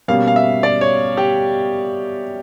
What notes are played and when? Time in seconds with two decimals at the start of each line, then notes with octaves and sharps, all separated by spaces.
0.08 B2 G3 A#3 C#4 F5
0.27 F5
0.36 E5
0.63 D5
0.81 C#5
1.17 G4